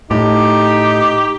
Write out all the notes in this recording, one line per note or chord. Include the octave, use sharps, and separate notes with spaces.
A2 D#4 G4